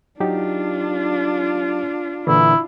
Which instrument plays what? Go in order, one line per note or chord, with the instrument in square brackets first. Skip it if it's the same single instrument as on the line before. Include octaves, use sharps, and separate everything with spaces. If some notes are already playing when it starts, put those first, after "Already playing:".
[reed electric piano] F#3 D#4 G4 [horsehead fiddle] D4 F4
[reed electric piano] A#2 D3 E3 [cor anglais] E4